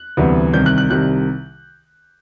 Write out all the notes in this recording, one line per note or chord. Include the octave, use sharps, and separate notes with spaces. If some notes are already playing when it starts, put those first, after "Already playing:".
Already playing: F#6
D2 C3 E3 G3 B3
C2 C3 D#3 G3 G6
F#6
F#6
C2 C3 D#3 G3 F#6